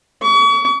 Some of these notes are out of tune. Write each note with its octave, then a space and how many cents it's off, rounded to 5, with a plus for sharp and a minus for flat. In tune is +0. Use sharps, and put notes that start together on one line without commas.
C#6 +40